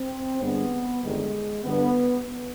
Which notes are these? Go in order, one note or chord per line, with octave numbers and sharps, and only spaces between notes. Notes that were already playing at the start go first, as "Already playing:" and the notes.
Already playing: C4
G2 D3 G#3 B3
G1 F2 D#3 G3 G#3
G1 G2 D3 B3